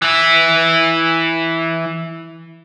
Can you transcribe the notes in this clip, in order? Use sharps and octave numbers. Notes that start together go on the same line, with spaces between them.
E3 E4